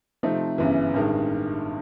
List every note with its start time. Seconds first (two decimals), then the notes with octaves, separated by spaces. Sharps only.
0.23 C3 F3 A3 C4 D#4
0.58 G1 F#2 C#3 E3
0.94 A1 G2 D#3 G#3